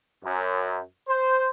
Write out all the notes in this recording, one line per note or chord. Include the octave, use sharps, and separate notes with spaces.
F#2
C5